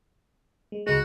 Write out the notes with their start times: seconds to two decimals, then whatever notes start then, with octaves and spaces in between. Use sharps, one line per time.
0.72 G#3
0.87 C#2 G#3 F#4